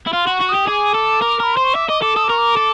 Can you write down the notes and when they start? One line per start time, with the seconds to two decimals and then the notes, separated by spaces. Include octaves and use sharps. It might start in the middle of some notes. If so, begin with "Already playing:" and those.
0.07 E4
0.13 F4 C6
0.27 F#4 C#6
0.41 F#4
0.49 D#6
0.55 G4
0.67 G#4 D6
0.95 A4
1.21 A#4
1.40 A#4 B5
1.54 C5 C6
1.64 C#6
1.75 E5 D6
1.89 D#5 D6
2.02 A4 D6
2.16 A4 D#6
2.24 D6
2.30 A#4 C#6
2.38 D6
2.57 A4